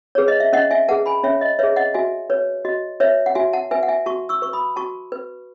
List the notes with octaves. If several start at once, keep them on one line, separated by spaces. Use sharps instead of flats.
G#4 B4 C#5
D#5
E5
C#4 D#5 F#5
E5 G#5
G#4 B4 F#5 A5
G#5 B5
C#4 C#5 E5
D#5
G#4 B4 C#5 E5
D#5 F#5
F#4 E5 G#5
B4 C#5
F#4 D#5
B4 C#5 E5
F#5
F#4 E5 G#5
F#5 A5
B4 E5 G#5
F#5
E5 G#5
F#4 A5 C#6
C#6 E6
B4 C#6
B5 D#6
F#4 A5 C#6
B4